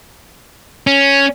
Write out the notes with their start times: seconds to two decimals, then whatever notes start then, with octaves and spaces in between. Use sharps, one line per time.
0.87 C#4